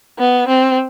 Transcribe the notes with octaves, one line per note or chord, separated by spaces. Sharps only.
B3
C4